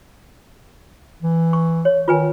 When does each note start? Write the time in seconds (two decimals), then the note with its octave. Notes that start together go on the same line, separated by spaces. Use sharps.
1.23 E3
1.53 C#6
1.85 C#5
2.08 D#3 F4 B4 G#5